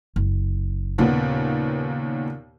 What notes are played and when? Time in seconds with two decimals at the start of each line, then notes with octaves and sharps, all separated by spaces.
0.16 F#1
0.98 D#2 A#2 C#3 B3